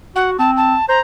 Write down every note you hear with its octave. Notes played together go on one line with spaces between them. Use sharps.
F#4 F#5
C4 A5
A5
C5 A#5